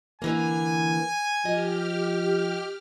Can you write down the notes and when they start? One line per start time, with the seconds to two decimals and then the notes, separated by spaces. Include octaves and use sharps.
0.22 D3 E3 A#3 G#5
1.45 F3 G4 D#5 F6